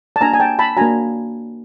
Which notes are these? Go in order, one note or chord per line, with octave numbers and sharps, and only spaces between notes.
A5
A#3 D4 F#4 G#5 A#5
G#5
G5 A5
A5 B5
A#3 D4 F#4 G#5 A#5